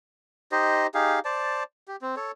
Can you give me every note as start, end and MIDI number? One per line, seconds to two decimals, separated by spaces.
0.52 0.87 63
0.52 0.87 67
0.52 0.87 72
0.52 0.87 75
0.94 1.19 63
0.94 1.19 67
0.94 1.19 68
0.94 1.19 77
1.25 1.63 72
1.25 1.63 74
1.25 1.63 81
1.88 1.96 67
2.02 2.15 60
2.16 2.31 69
2.16 2.31 73